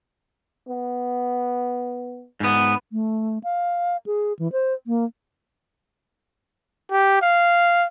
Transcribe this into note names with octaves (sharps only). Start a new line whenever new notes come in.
B3
G#2 B3
A3
F5
G#4
E3
C5
A#3
G4
F5